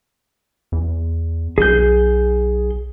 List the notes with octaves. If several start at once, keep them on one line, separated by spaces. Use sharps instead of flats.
E2
B1 G#4 G6